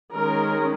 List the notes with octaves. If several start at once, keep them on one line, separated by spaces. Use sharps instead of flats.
D#3 G#3 C#4 A#4